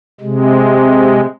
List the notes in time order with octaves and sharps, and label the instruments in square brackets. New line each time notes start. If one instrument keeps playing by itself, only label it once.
[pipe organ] C3 G#3